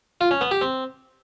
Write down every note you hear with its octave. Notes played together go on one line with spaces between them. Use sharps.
F4
C#4
B3
G4
C4